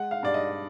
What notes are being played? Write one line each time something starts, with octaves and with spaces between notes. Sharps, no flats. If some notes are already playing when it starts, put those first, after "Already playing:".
Already playing: G#3 F#5
F5
G2 D5
D#5